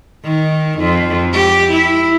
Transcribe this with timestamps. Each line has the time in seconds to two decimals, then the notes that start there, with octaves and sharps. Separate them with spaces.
0.24 D#3
0.79 F2
1.33 G4
1.71 E4